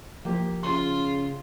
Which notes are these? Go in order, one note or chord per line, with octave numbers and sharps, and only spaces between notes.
F3 A#3 G4
C#3 F4 C6